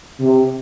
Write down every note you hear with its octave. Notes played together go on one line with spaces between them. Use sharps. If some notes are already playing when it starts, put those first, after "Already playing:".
C3